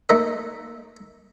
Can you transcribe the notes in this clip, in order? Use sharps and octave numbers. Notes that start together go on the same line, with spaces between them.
A3 A#3 D#4 D#5 E5